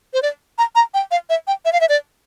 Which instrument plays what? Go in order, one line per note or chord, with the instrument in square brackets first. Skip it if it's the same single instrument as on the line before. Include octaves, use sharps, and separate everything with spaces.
[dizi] C5
D5
A#5
A#5
G5
F5
E5
G5
E5
F5
E5
D5